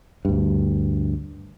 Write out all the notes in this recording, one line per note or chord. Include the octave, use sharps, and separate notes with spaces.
D2 G2